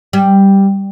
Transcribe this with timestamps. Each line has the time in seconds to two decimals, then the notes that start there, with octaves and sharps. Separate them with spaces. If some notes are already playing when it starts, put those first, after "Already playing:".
0.13 G3